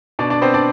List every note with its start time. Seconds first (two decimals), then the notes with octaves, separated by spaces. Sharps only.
0.19 B2 D4 D5
0.30 D4 D5
0.42 B3 C4 C5
0.54 D4 D5